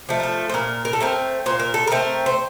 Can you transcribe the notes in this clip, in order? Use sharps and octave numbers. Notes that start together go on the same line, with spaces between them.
F3 A3
A#4
A4
C5
A#2 A#4
A#4
A4
A3 C4 A#4
A#2 C5
A#4
A4
A3 C4 A#4
C5